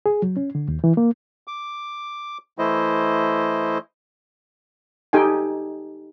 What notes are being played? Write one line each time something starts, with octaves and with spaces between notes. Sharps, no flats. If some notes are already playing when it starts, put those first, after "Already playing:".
G#4
F#3
C#4
D3
D#2
E3
A#3
D6
E3 A3 E4 C5 D#5
D#4 G4 A4 G5 G#5